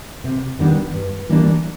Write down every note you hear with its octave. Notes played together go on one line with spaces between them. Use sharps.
C3
D#3 G3 B3 D4
G2
E3 G3 A#3 D4